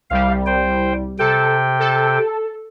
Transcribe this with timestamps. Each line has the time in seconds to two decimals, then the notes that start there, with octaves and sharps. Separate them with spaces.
0.10 C2 G3 F5
0.46 C5 G5
1.19 C3 A4 G5
1.80 A4